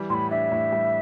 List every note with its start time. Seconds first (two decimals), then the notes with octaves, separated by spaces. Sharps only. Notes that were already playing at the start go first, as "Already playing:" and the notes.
Already playing: E3 G3
0.10 A2 B5 C6
0.30 D4 E5
0.52 A2
0.72 G3